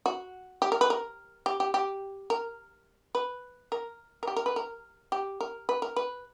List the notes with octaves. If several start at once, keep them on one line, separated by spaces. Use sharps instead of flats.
F#4
G4
A#4
B4
A#4
G4
G4
G4
A#4
B4
A#4
A#4
G4
A#4
B4
A#4
G4
A#4
B4
A#4
B4